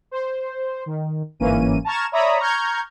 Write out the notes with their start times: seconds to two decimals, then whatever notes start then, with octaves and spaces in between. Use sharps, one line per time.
0.11 C5
0.86 D#3
1.40 G1 G#2 E3 A#3 C#4 D#7
1.85 A5 A#5 C#6 F6 G#6 E7
2.12 C#5 D5 E5 A#5 B5 D#6
2.39 A#5 C#6 F6 G6 G#6